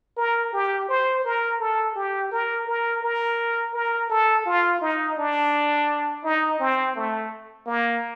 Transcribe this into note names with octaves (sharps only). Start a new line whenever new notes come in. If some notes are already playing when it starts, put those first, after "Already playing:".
A#4
G4
C5
A#4
A4
G4
A#4
A#4
A#4
A#4
A4
F4
D#4
D4
D#4
C4
A3
A#3